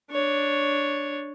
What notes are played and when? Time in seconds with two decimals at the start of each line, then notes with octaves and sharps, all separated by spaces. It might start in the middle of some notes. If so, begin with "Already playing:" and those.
0.11 D4 C#5